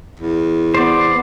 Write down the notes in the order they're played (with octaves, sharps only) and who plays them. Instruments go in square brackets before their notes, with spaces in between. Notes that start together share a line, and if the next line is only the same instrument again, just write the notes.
[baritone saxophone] E2
[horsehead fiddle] B3 [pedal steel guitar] C5 D5